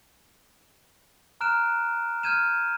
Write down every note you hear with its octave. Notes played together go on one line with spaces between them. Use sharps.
A#5 F6 F#6 D7 E7
F6 G6 G#6 D#7 E7